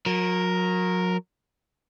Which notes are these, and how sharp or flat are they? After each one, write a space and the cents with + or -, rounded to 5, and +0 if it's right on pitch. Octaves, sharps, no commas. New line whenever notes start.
F#3 -35 A#4 +0